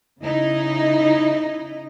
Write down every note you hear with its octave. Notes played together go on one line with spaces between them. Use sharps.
C#3 D#4 E4 D#5